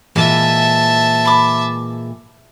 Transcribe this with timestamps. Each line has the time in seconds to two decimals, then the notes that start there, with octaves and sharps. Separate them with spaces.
0.16 A#2 E3 G#3 E5 A5
1.25 B5 D6